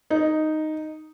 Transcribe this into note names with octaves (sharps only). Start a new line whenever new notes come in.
D#4